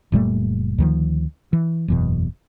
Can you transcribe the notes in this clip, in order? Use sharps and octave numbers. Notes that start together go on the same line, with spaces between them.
F#1 A#2 G3 A3
D2 D#3 F3
E3
F#1 E2 B2